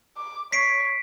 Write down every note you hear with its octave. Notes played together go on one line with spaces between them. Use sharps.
D6
C#5 B6 C7 D7